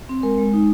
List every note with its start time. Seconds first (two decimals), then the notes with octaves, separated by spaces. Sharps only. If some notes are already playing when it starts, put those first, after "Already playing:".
0.09 C4
0.23 G#3 A#4
0.38 G#3
0.53 D#4